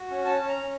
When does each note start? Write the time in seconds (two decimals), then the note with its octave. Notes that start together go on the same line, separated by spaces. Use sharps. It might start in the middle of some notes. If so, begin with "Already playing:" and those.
Already playing: F#4
0.10 C#4
0.25 C#4 A5
0.41 C#4
0.49 A#5
0.56 C#4